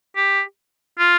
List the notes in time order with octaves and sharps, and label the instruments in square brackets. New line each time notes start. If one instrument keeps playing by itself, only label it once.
[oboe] G4
F4